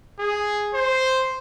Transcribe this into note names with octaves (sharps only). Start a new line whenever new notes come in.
G#4
C5